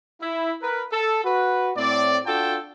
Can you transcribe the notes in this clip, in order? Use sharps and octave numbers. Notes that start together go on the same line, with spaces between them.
E4
A#4 B4
A4
F#4 B4
A2 C4 D5
D4 F4 F#4 A4 G5 A5